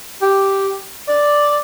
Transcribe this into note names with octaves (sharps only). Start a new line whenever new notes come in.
G4
D5